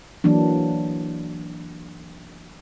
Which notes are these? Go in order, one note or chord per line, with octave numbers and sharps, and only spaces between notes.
E3 F#3 A#3 D4